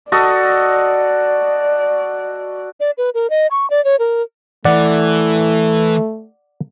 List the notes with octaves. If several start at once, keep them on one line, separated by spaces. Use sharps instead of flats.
F#4 A4 D5 D#5
D5
B4
A#4
D#5
C#6
D5
C#5
A#4
E3 A3 D5 F#5